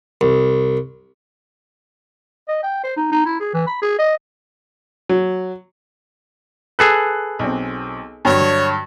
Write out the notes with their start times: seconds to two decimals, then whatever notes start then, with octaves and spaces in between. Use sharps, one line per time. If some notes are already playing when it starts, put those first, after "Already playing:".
0.21 C2
2.48 D#5
2.63 G5
2.83 C5
2.96 D#4
3.11 D#4
3.25 E4
3.40 G#4
3.53 E3
3.66 B5
3.81 G#4
3.99 D#5
5.09 F#3
6.79 G#4 A4 B4 F#6
7.39 B1 C4
8.25 G2 D3 F#3 C#5